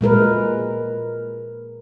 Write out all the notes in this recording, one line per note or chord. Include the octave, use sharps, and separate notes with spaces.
A#2 G#3 A#4 B4